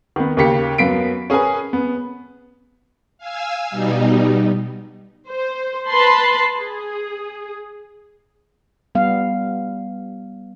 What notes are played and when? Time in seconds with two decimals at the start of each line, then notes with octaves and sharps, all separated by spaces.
0.16 D#3 B3
0.37 D#2 C#3 A#3 G4 B6 C#7
0.78 F#2 B3 F5 B6 C7 D7
1.30 C#4 G#4 A#4 B4 G#5
1.73 B3
3.18 F5 G#5 E6
3.70 B2 G3 D#4
5.29 C5
5.89 B4 A5 B5 C6
6.56 G#4
8.95 G3 B3 F5